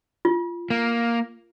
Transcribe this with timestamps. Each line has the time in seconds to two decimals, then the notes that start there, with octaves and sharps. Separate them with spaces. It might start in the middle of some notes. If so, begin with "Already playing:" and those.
0.25 F4
0.70 A#3